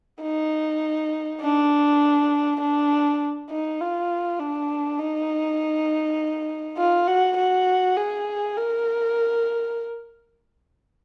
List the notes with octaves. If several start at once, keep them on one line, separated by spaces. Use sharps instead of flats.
D#4
D4
D4
D#4
F4
D4
D#4
F4
F#4
F#4
G#4
A#4